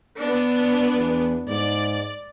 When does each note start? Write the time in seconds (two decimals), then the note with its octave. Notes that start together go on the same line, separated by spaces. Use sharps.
0.19 B3 D4
0.96 E2
1.47 G#2 D5